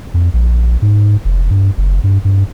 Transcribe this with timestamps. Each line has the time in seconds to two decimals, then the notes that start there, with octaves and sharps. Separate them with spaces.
0.14 F2
0.34 A#1
0.82 G#2
1.25 F1
1.50 G2
1.78 F#1
2.04 G2
2.25 G2